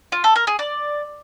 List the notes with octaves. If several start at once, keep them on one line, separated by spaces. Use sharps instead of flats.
F4
A4
A#4
G#4
D5